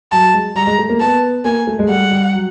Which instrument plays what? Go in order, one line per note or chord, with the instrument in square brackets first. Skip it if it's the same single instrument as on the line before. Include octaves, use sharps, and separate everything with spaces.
[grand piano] F#3 [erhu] A5
[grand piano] G#3
[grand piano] G3 [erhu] A#5
[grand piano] G#3
A3
A#3
[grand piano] B3 [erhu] A5
[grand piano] A#3 [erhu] G#5
[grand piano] A3
G#3
[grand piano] G3 [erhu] F#5
[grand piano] G3
F#3